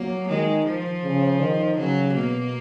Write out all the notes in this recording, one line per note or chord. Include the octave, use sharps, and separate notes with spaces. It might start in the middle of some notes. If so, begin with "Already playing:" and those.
Already playing: F#3 A#3
D#3 G#3
F3
C#3
D#3
C#3 F#3
B2 A#3